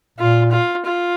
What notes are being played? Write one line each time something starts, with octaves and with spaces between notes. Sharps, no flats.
A#2 F4
F4
F4